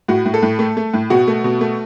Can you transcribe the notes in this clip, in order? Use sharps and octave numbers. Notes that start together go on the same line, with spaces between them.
A2 F#4
A2
A4
A2
A3
A3
A2
B2 F#4
A3
B2
A3